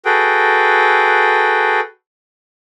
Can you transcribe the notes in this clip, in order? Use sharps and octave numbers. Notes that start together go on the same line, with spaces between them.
F#4 G#4 A4 B4 G5